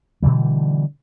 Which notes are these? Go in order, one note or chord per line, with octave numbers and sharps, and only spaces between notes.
B2 D3 E3 G3